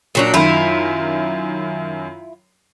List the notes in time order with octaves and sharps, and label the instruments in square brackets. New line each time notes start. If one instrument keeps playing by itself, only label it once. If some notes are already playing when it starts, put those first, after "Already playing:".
[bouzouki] A#2 F#3 D4
[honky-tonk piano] F#2 D#3 [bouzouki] E4 F4